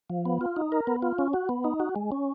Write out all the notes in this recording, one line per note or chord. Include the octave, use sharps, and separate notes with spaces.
F3
B3
F4
D#4
A#4
B3
F4
C#4
F#4
B3
D#4
F#4
G#3
C#4